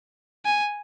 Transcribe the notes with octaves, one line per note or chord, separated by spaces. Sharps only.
G#5